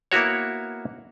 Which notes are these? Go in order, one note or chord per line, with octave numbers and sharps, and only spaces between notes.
A#3 B3 E4 F#4 C#5